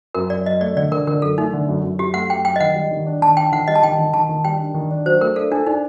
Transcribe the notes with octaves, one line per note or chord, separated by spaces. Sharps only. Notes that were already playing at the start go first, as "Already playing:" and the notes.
F#2 A#4
F#2 D5
F#2 D#5
A3 D5
D3 D5
D3 A#4
D3 A#4
F#2 A4
A3 D#4
D3
F#2
F#2
F#2 G4
A3 F#5
F#2 G5
F#2 G5
D#5
D#3 F#5
G3
D#3
D4
D#3 A5
D4 G5
D#3 F#5
G3 D#5
A5
D#3 G5
D#3
D#3 A5
D#3
G3 G5
D4
D#3
D4
F#3 C5
A3 A#4
D4 A4
D4 A4
D4 D#4